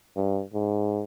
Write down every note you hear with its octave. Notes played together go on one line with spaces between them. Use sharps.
G2
G#2